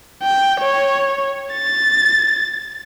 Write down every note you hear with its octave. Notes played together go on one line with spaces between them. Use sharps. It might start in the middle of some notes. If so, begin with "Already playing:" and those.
G5
C#5
A6